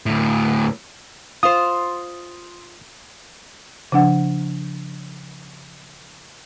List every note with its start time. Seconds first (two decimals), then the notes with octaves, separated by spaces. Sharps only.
0.06 D2 A2
1.43 F4 C5 D#6
3.92 C#3 F3 D4 F#5